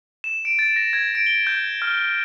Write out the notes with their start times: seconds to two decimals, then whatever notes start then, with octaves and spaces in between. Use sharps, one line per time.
0.24 E7
0.45 D7
0.59 A6
0.76 A#6
0.93 G#6
1.15 D7
1.27 G7
1.47 G6
1.82 F6